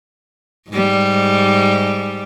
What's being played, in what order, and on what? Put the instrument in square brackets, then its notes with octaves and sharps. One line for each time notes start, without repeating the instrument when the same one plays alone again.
[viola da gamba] G#2 G3